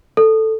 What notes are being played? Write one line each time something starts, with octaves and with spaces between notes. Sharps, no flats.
A4